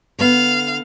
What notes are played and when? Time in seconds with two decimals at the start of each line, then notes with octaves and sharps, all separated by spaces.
0.19 D3 B3 F5